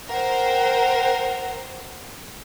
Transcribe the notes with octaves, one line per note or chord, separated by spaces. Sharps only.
A#4 C5 F#5 G5